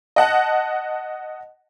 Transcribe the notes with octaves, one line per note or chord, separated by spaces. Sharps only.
D#5 F#5 A5